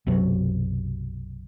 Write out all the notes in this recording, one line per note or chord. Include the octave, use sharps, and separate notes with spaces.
B1 F#2 C3 F#3